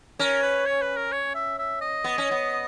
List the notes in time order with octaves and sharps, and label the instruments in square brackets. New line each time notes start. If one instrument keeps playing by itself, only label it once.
[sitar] C#4 [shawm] A#4
[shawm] B4
C#5
B4
A#4
C#5
E5
E5
D#5
[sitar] B3
C#4
B3